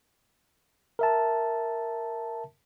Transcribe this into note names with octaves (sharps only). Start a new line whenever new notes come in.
A#4 E5 A5